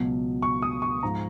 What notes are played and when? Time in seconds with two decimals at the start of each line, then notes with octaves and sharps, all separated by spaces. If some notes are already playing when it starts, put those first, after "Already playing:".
Already playing: C#2 B2 F#3
0.42 C#6
0.62 D#6
0.82 C#6
1.03 G#2 F3 A#5